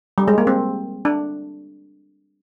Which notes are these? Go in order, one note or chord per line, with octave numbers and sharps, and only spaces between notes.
G3
G#3
A#3
C4
D4